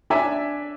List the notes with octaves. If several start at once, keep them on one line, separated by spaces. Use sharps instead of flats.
D4 E5 G#5